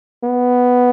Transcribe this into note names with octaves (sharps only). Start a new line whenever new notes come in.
B3